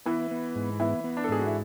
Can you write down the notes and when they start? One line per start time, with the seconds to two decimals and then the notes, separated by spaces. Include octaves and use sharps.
0.06 E3 B3 E4
0.31 B3
0.55 G#2
0.80 E3 B3 E4
1.04 B3
1.17 D4
1.24 A4
1.29 G#2 G#4
1.39 F#4
1.46 E4